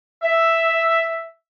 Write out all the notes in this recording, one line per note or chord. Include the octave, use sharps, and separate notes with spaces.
E5